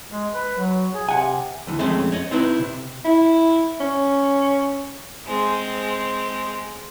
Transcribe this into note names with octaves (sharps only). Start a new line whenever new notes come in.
G#3
B4
F#3
G#4
C3 F#5 G#5
D2 E3
F2 G#3 A3 C4 C#4
C#5 D#5
C4 D#4 E4 B4
C3
E4
C#4
G#3 C4